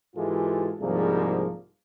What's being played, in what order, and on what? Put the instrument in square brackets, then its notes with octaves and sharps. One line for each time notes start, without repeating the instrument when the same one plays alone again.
[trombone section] G#2 E3 G#3 F4 G4 A4
C2 G#2 F3 G3 A#3 G#4